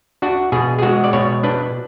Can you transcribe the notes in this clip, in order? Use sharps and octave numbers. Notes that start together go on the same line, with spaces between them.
D4 F#4
B2 G#4
G#4
G#3 F#4
D5
B2 C#5
D4 B4